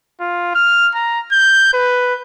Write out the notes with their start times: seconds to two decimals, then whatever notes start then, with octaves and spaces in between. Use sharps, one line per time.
0.21 F4
0.55 F6
0.95 A#5
1.32 G6
1.73 B4